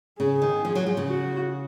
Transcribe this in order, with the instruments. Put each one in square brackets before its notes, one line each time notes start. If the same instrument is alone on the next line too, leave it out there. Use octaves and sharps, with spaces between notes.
[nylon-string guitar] C#3 [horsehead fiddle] G#4
[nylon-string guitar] D#3
F3
F#3
F3
C#3
[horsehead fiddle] F#4